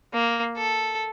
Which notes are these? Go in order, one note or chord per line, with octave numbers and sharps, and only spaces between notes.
A#3
A4